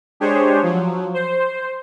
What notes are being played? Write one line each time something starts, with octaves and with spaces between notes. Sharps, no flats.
G#3 D4 G4 G#4 C5 C#5
F3 F#3
C5